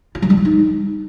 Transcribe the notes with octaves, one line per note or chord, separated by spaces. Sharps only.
F4
F#3
G3
E4
D#4